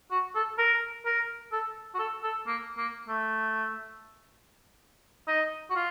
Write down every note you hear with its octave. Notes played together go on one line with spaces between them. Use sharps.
F#4
A4
A#4
A#4
A4
F#4
A4
A4
A#3
A#3
A3
D#4
F#4
F4